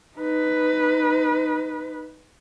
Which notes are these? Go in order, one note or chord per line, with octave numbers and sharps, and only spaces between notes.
D#4 B4